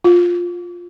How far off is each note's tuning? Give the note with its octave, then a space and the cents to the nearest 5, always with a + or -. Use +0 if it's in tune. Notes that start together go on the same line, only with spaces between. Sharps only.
F4 +5